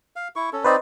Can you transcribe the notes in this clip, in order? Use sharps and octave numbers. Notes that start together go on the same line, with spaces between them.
F5
E4 C#6
C#4 A4
C4 D#4 B4 C5 D5 D#5